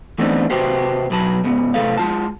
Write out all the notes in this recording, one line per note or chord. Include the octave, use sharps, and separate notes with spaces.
E3 A3 B3 C4 D4 D#4
C3 F#4 G4 B4 C5
B1 F#3 B4 A5
G#2 C#3 B3
A2 C3 G3 A4 B4 F5
G#3 F4 A5